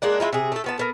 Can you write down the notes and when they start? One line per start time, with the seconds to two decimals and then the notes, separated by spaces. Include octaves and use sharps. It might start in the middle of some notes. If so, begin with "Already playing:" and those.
0.02 G#3 A#3 D4 F#5
0.20 G#3 A#3 E4 F4
0.33 C3 G#4
0.52 A3 A4
0.64 F3 B3 A5
0.78 A3 B3 A#4